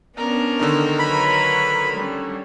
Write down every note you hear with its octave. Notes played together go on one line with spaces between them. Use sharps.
B3 C#4 D4 A#4
D3 D#3 D#4
F#3 B4 C#5 B5
G3 C#4